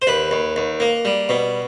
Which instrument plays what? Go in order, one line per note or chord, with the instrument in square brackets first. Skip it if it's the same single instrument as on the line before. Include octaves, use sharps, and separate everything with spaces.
[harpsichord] C5
D#2 B4
D#2
D#2
A#3
G3
B2